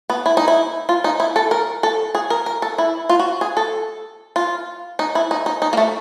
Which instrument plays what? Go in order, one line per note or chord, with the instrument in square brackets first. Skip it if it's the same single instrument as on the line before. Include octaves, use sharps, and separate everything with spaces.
[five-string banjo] B3
E4
D#4
E4
F4
D#4
E4
A4
A#4
A4
G#4
A#4
A#4
A4
E4
F4
F#4
G#4
A4
F4
D#4
E4
D#4
D#4
D#4
A#3
A3